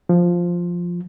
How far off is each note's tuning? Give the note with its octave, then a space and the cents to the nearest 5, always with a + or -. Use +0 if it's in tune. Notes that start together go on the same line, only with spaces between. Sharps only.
F3 +5